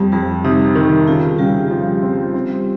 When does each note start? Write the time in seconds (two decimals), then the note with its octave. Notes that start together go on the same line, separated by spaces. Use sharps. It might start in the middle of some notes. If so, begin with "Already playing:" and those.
Already playing: F2 G3 G4
0.12 F2 G3 G4
0.44 C3 D#4
0.76 D#3
1.07 C#3 F4
1.39 C#3 G3 G4
1.71 F3
2.02 C4
2.34 C4